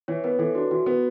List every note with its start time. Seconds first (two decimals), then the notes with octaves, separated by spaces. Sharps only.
0.08 E3 C#5
0.24 B3 B4
0.39 E3 A4
0.55 D4 F#4
0.71 E3 F#4
0.86 B3